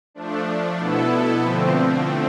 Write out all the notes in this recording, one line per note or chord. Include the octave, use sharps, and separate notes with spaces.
F3 A3 D4
B2 B3 E4 A4
D3 F3 A3 C4